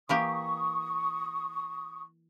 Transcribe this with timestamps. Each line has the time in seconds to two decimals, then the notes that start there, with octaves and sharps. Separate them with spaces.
0.09 E3 A#3 G4 C#6 D#6